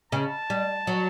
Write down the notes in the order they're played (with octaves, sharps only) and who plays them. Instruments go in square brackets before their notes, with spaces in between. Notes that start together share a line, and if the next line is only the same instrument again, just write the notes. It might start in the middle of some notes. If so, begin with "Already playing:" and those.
[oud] C#3 [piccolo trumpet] A5
[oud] G3
F#3